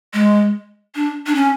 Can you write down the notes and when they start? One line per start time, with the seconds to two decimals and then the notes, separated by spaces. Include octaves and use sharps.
0.14 G#3
0.95 D4
1.27 D4
1.35 C#4